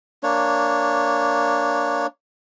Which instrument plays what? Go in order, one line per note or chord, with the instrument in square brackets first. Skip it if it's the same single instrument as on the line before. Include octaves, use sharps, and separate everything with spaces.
[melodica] A#3 D4 C#5